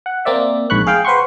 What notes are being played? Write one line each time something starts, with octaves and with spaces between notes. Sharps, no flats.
F#5
A#3 C4 D5 E5
A#1 G#2 B5 C#6 F#6
G#4 F5 G5
B4 C5 F#5 C6 C#6